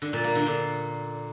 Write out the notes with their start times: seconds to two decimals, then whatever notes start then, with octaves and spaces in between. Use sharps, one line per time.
0.02 D3
0.13 A#2
0.24 A#3
0.35 D3
0.46 A#2